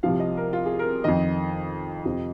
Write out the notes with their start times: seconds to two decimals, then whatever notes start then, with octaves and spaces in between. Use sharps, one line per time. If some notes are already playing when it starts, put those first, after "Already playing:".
0.03 C2 C3 F3 F5
0.20 D#5
0.37 A#4
0.53 F4
0.66 G#4
0.79 A#4
1.04 F2 D#3 D#5
2.05 F2 C3 F3